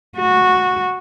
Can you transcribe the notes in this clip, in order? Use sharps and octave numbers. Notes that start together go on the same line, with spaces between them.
F#4